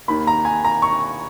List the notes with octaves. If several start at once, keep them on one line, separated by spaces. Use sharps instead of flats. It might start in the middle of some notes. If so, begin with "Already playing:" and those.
D#2 D#3 A#3 B5
A#5
G#5
A#5
C#6